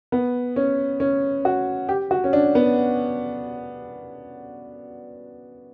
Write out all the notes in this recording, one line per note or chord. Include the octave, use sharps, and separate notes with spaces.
B3
C#4
C#4
F#4
G4
F#4
C#4
D4
B3